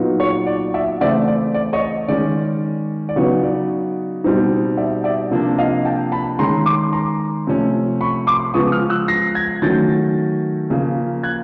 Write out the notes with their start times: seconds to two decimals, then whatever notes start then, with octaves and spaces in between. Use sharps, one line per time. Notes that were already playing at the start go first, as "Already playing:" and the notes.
Already playing: A#2 F#3 B3 D#4
0.20 C#5
0.47 D5
0.74 D5 E5
1.01 C#3 E3 A3 C4 D5 E5
1.28 D5
1.54 D5
1.73 C#5 D#5
2.08 D#3 G#3 C#4 D5
3.09 D5
3.16 C#3 F#3 B3 D#4 C#5
3.43 D5
4.24 B2 G3 C4 D#4
4.77 D5 E5
5.04 D5 E5
5.31 C3 F3 A#3 D4
5.58 D#5 F5
5.85 G5 A5
6.12 A5 B5
6.39 D#3 G#3 C#4 A#5 C6
6.66 C6 D6
6.93 A#5 C6
7.47 C3 F3 A3 C#4
8.01 B5 C#6
8.27 C6 D6
8.54 C#3 F3 G#3 B3 C#6 D#6
8.72 D#6 F6
8.90 E6 F#6
9.08 A#6 C7
9.35 G#6 A#6
9.62 D#3 F#3 A3 C#4 G6 A6
10.70 C#3 F3 A#3
11.24 F#6 G#6